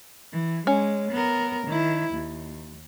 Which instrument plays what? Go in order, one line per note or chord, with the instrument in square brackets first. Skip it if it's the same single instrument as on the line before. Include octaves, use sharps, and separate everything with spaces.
[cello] E3
[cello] G#3 [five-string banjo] C#4
[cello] B3 A#4
D#3 E4
D#2